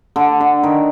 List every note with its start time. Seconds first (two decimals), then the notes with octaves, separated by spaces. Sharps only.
0.16 D3
0.41 D3
0.63 D#3